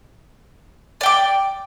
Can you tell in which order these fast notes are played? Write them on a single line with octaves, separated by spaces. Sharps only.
D5 G5 D6